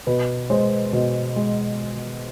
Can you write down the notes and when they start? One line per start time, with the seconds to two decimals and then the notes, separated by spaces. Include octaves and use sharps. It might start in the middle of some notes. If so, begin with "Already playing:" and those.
0.07 B2 B4
0.50 G#3 C5
0.93 B2
1.36 G#3